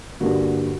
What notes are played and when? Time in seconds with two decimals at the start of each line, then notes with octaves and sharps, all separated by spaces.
0.21 G2 D3 A#3 F#4